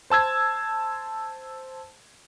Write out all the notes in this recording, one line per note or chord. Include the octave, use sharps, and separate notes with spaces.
C5 A5 E6 G#6